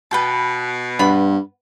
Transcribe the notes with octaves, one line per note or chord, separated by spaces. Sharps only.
B2 B4 G5 A5
G2 B3 B5